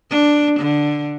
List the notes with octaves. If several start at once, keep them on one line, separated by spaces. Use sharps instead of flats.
D4
D3